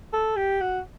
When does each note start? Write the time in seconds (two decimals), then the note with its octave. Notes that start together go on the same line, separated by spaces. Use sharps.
0.13 A4
0.36 G4
0.61 F#4